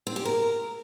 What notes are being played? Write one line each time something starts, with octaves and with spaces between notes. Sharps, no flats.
C4
G4
A#4